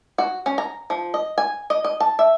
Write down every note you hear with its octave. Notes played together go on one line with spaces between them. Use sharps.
F#4
C#4
A#5
F3
D#5
G#5
D#5
D#5
A5
E5